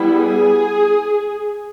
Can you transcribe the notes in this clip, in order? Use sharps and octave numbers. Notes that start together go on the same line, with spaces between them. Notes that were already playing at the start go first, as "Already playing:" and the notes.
Already playing: G3 B3 E4
G#4